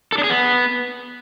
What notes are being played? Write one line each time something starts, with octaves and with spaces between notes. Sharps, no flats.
A4
D4
G#4
B3